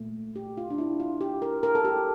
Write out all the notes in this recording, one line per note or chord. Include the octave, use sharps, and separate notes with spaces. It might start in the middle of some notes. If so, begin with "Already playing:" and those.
Already playing: A#2 A3
G4
F4
D4
E4
F4
G4
A#4
A#4
A4
G4